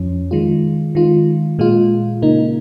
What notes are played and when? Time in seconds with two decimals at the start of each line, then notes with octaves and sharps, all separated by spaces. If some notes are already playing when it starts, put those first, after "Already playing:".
Already playing: F2 F3 C#4
0.31 D#3 G#3 F4
0.95 D#3 G#3 F4
1.59 A#2 G#3 F4
2.22 C#3 A#3 D#4